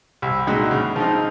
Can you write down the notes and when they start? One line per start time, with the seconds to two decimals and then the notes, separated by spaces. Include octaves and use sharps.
0.22 C2
0.47 A#2 G#3 D#4 F#4
0.71 C#3
0.96 F3 C4 D#4